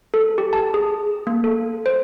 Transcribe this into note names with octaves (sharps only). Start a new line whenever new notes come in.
A4
G4
A5
G#4
A#3
A4
C5